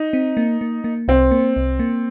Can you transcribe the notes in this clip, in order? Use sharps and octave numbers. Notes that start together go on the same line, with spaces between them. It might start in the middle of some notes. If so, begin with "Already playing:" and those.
Already playing: D#4
C4
A#3
A#3
A#3
C2 C4
A#3
C2
A#3